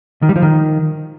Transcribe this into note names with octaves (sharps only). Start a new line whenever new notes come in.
D#3
G3
F3
D#3